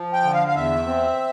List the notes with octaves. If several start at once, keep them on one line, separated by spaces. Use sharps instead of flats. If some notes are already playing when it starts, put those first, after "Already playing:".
Already playing: F3
G5
D3
F5
F5
E2 E5
C4